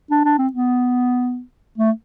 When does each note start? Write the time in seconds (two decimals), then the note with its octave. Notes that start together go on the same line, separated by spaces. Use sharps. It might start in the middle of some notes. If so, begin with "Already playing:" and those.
0.10 D4
0.25 D4
0.38 C4
0.53 B3
1.78 A3